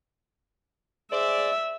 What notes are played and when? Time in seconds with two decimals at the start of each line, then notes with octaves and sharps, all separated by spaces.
1.12 G#4 C5 D5 E5